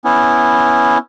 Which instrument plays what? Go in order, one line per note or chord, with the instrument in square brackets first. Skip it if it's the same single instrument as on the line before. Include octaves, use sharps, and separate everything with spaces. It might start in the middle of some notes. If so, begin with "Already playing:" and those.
[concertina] B3 C#4 E4